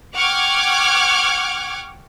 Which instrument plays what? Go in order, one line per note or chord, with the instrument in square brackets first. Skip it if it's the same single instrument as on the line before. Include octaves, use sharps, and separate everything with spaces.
[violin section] F#5 G5 C#6 D6 F6 G#6